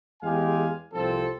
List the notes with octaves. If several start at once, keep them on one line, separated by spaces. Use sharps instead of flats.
E2 G#3 G4 F5 G#5
C2 F3 C4 A4